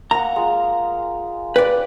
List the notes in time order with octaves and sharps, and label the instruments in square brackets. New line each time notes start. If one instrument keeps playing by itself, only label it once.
[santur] A#3 F#5 [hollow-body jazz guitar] A#5
[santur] G#3 F4
[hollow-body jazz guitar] B4 D5 [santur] G5